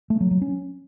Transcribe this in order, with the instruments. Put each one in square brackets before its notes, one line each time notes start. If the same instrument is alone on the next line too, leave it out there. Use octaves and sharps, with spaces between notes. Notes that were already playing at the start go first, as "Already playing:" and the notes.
[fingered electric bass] A3
F#3
F#3
C#4